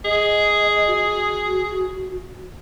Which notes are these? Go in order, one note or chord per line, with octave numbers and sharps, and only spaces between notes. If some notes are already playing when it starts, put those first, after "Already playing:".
G#4 D#5
F#4